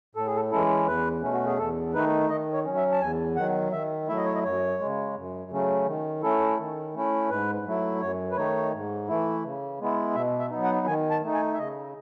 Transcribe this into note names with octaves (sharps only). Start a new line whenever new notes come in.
A2 A4
G#4
A4
E3 G#3 C#4 E4 A4
E2 B4
B2 A3 C#4
F#4
G#4
E2 A4
D#3 A3 D#4 B4
D#3 D#5
C#5
F#3 C#4
E5
A5
E2 G#5
D#3 F#3 F#5
D#3 E5
F#3 A3 E4 E5
D#5
C#5
D#5
F#2 C#5
C#3 G#3
F#2
C#3 F#3 A3 C#4
D#3
A3 C#4 E4 A4
D#3
A3 C#4 E4
G#2 B4
F#3 A3 E4
F#2 C#5
B4
D#3 A3 D#4 C#5
G#2
E3 A3 E4
C#3
G#3 B3 E4
B2 E5
E5
F#3 B3 D#4
F#5
D#3 G#5
A5
A3 D#4
G#5
E5
C#3 D#5